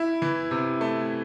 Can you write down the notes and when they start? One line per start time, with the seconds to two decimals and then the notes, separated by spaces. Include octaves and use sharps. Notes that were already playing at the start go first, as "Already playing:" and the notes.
Already playing: E4
0.22 E3
0.51 C3
0.81 A3